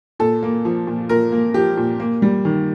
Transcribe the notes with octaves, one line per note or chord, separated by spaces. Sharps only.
A#2 A4
A#3
F3
A#2
A#2 A#4
A#3
F3 G4
A#2
A#3
G3
D#3